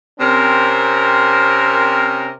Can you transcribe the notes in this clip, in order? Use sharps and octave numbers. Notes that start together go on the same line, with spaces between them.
C3 C4 C#4 A#4